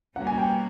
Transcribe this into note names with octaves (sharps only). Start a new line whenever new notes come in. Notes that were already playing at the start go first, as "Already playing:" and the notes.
B2 G3 A#3 C#4 F#4 F#5
G#5
G5